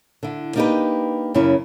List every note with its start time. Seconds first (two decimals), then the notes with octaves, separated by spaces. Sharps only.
0.23 D3 E4
0.56 A#3 D4 D#4 F#4 G4 B4
1.34 F#2 C#3 C#4 E4